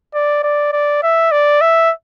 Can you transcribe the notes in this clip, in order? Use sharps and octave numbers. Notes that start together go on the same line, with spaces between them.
D5
D5
D5
E5
D5
E5